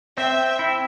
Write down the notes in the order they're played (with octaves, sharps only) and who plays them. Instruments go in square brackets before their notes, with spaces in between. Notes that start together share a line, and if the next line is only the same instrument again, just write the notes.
[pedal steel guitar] C4 [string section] E5 G5
[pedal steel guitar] E4